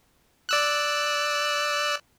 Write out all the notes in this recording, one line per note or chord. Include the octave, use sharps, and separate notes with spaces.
D5 E6 F#6